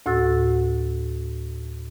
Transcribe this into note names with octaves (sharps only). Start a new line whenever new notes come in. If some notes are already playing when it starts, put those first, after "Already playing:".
D2 A2 F#4 E6 A6